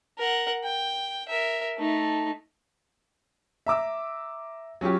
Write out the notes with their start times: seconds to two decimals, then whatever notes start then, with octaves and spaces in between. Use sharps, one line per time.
0.18 A#4 F#5
0.64 G5
1.29 A#4 E5
1.77 A3 D#4
3.67 E5 A#5 D6 E6
4.81 F#3 C#4 F4 G4